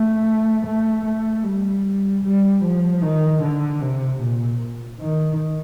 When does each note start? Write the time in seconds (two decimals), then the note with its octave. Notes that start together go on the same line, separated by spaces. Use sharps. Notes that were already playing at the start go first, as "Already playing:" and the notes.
Already playing: A3
0.66 A3
1.05 A3
1.44 G3
2.24 G3
2.64 F3
3.02 D#3
3.43 D3
3.81 C3
4.22 A#2
5.00 D#3